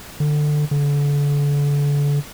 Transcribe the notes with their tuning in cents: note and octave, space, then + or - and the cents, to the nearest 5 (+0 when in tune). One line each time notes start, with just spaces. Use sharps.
D3 +20
D3 -35